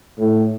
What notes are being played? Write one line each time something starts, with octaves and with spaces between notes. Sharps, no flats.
A2